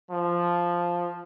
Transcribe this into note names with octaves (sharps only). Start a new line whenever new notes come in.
F3